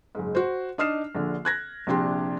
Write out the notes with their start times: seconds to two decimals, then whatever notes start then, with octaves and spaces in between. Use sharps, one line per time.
0.15 F#1 G#2
0.35 F#4 C5
0.78 D4 D#4 D#6 F6 C7 E7
1.15 A#1 D3
1.45 F#6 G#6 A#6
1.87 A#1 C3 D4 G4 C6